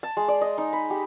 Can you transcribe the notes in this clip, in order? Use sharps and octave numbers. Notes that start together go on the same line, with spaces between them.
A5
G#3
D5
D#5
D#4
B5
G4